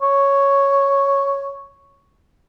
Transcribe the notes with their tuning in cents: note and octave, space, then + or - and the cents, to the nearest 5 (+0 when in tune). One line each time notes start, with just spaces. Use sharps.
C#5 +0